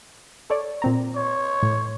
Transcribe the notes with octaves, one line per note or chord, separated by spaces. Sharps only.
A4 C#5 D5
A#2 C4 A#5
C#5
A2